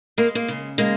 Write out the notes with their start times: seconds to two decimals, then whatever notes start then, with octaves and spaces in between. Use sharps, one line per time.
0.18 G#3 A#3
0.35 A#3
0.48 C#3
0.78 G#3 A#3